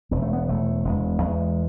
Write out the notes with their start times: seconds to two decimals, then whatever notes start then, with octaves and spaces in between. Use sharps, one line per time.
0.11 E1 B3
0.22 A3
0.33 B3
0.48 E1 A3
0.84 E1 G#3
1.22 E2 G#3